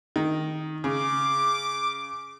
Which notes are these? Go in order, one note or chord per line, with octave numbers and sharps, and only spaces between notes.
D#3
C#3 D6